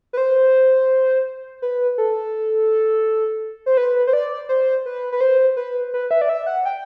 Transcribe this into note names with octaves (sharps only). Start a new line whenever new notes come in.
B4
C5
B4
A4
C5
B4
C5
D5
C5
B4
B4
C5
B4
B4
E5
D5
E5
F#5
G5